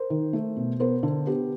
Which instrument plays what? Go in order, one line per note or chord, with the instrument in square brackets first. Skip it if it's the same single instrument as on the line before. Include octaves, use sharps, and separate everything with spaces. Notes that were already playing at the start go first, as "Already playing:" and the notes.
Already playing: [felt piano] A#4 C5
D#3
A3
B2
B3 A#4 C5
D3
B3 G4